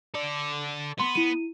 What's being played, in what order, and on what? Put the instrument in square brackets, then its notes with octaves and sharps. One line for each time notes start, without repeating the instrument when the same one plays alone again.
[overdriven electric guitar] A4 D5
[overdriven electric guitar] B3 [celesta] C6
[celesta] E4 D#7